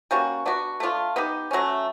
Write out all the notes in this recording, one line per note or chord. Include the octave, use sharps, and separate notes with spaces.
G3 A#3 C#4 F#4
B3 D4 F#4
A3 D4 F4
B3 D#4 G4
F#3 A3 C#4